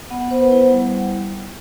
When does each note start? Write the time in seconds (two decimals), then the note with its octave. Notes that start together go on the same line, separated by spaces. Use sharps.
0.10 B3 F#5
0.21 F#5
0.31 B3 C5
0.41 B4
0.52 E4 C5
0.61 F#5
0.72 G3 F#5